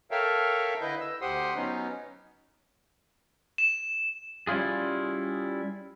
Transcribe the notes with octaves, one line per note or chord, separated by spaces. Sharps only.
A4 A#4 C#5 E5 F5 G5
D3 E4 B4 D#5 G6
E6
D2 G4 C5 F#5 C6 D#6
F#3 B3 C#4 D#4
E7
G3 C#4 E4 F4 G#4